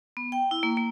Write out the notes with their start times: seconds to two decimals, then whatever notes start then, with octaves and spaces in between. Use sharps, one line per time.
0.17 B3
0.32 G5
0.51 E4
0.63 A#3
0.77 A#3